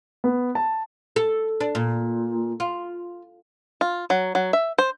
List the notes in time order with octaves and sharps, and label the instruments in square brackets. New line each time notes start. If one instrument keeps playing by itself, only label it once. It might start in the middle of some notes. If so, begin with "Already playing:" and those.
[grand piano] B3
A5
[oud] A4
D4
A#2
F4
[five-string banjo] F4
F#3
F#3
E5
C5